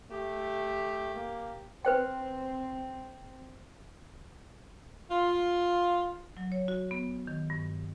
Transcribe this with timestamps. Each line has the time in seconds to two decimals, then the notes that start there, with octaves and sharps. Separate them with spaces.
0.11 A3 G4
1.15 A#3
1.85 C4 B4 C5 G5
5.11 F4
6.37 F#3
6.52 C#5
6.68 F#4
6.91 B3
7.27 D#3
7.50 G2